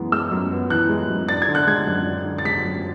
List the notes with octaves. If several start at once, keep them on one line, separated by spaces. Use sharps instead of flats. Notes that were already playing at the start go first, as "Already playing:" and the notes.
Already playing: F#2 E3 G#3 B3
G#3 E6
F#2
B3
E3 F#6
G#3
F#2
D4 A6
G#6
D3
F#6
G#3 G#6
F#2
D4
D3
A6
G#3 B6
F#2